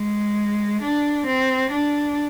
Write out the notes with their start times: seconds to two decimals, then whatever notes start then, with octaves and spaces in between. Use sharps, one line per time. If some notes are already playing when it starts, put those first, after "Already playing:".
Already playing: G#3
0.82 D4
1.26 C4
1.71 D4